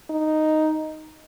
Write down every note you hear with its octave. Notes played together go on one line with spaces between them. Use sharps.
D#4